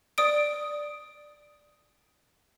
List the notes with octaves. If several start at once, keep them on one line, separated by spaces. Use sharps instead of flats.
D5 D#6 D7